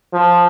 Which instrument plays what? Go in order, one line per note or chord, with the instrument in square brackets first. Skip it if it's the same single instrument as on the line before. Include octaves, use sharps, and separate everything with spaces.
[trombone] F3